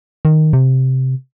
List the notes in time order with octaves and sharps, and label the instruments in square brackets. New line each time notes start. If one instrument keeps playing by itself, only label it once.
[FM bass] D#3
C3